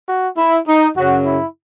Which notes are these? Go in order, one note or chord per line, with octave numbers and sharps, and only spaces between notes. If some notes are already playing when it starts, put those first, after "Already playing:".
F#4
E4
D#4
F#2 C#3 F#3 F#4
E4